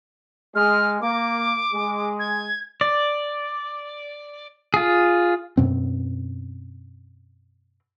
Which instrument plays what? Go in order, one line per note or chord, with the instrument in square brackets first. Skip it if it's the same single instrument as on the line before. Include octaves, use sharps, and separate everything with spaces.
[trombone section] G#3 [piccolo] F6
[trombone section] A#3 [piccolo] D6
[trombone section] G#3
[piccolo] G#6
[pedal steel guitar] D5
F4 G#4
[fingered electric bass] F#2 B2 C4